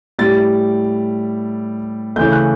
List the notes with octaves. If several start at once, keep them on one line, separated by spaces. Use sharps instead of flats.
A2 G3 A6
C#3 E3 A3 G6
F#6